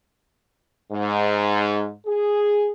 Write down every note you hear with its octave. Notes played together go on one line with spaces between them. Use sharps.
G#2
G#4